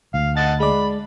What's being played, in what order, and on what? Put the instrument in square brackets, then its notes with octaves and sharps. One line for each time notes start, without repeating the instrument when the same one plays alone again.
[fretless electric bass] D2 [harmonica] F5
[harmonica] D#5 F#5 A5 [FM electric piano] A6
[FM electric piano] G#3 D5 [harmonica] B5